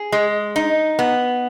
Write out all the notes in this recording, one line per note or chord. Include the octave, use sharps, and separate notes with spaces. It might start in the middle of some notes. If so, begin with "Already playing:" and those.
Already playing: G#4
G#3
D#4
B3